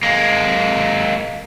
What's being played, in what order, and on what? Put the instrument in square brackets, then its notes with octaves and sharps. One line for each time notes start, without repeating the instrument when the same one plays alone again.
[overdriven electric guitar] G#3 A#3